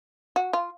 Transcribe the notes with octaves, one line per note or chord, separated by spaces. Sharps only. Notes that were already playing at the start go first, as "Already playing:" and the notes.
F#4
F4